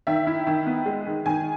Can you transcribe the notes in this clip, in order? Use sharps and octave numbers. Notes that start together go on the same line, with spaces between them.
D#3 E5
E4
D#3
B3
G#3
D#3
D#3 G#5